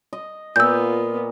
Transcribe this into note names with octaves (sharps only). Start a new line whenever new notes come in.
D#5
A#2 B3 F4 E6 G6